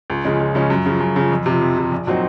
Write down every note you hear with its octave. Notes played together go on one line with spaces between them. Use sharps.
C#2
C#3 F3 G#3 C#4
C#2
C#3 F3 G#3 C#4
F#2
C#3 F3
F#2
C#3 F3
F2
C3 F3
F2
C3 F3
A#1
A#2 F#3 C4 D#4